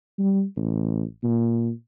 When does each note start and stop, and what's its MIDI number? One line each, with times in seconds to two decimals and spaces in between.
0.18 0.43 55
0.56 1.03 33
1.23 1.71 46